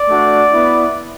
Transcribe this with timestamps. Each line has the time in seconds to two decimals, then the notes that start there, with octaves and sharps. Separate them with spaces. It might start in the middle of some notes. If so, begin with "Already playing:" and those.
Already playing: D5
0.09 A3 D4 F#4
0.51 B3 E4